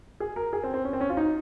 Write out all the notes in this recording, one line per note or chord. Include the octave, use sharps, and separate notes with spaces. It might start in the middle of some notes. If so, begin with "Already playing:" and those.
G#4
A#4
G#4
C4
C4
C#4
C4
C#4
F4
D#4